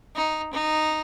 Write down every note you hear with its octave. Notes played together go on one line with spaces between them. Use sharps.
D#4
D#4